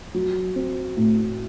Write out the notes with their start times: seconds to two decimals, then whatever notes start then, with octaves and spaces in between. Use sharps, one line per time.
0.14 F#3
0.56 C4
0.97 A2